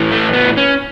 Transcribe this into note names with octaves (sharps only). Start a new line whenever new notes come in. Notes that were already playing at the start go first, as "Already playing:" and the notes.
Already playing: A2 E3
A3
B3
C#4